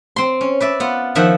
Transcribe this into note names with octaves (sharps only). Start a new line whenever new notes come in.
C4 C6
C#4
B4 D5 E5
B3 F4 F#5
D#3 F3 E5 F#5